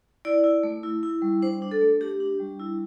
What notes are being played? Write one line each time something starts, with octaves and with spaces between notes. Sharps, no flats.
E4 D5
E4
A3
E4
E4
G3
D4 C5
D4
A4
A3
D4 G4
D4
G3
E4